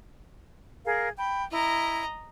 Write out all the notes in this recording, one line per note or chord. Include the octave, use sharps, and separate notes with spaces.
G#4 A#4 F5
G5 B5
E4 D#5 A#5